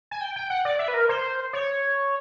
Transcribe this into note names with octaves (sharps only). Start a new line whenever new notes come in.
G#5
G5
G5
F#5
D5
E5
B4
A#4
C5
C#5